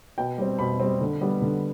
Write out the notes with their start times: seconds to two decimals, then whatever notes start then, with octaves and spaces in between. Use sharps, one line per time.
0.18 B2 G5
0.38 G3 C4
0.59 B2 B5
0.80 G3 C4
1.01 D3
1.21 G3 B3
1.42 D3